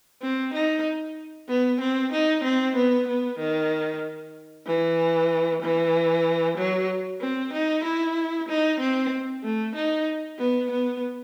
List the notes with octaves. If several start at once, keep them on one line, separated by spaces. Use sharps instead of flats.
C4
D#4
B3
C4
D#4
C4
B3
B3
D#3
E3
E3
F#3
C4
D#4
E4
D#4
C4
A3
D#4
B3
B3